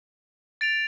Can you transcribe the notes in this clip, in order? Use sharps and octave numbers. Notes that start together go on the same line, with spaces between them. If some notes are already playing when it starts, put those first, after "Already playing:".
A6 D7 F7